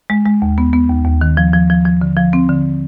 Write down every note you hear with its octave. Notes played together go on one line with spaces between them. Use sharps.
G#3
G#3
D#2
B3
B3
D#2
D#2
D#3
F3
F3
F3
F3
D3
F3
C4
D3